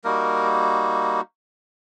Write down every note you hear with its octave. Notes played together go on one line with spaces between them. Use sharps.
G3 A#3 D#4 F#4 A#4